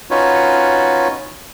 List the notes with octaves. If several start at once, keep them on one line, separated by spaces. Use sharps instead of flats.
C#4 D#4 F4 F#4 B4 C#5